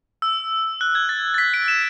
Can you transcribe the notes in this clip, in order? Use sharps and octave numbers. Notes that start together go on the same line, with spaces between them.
E6
F#6
G#6
A6
A6
B6
D7
E7